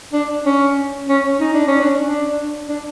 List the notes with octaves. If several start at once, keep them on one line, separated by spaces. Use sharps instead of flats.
D4
C#4
C#4
D#4
D4
C#4
D4
D4
D4